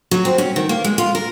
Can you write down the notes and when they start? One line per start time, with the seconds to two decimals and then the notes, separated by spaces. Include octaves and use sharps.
0.11 F#3
0.25 C4
0.38 C#4
0.56 D#3
0.69 A#3
0.84 G#3
0.98 F4
1.15 A#4